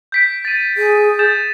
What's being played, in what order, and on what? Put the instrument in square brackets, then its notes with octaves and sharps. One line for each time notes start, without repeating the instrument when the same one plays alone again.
[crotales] G6 B6 D7
A6 D#7
[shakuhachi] G#4
[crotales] G6 A6 E7